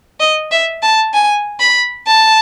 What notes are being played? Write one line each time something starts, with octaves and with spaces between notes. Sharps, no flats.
D#5
E5
A5
G#5
B5
A5